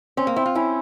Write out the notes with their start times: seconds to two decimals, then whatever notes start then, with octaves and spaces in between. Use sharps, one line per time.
0.17 C4 C#4
0.27 A#3
0.36 C4 E4
0.46 F4
0.55 C#4 E4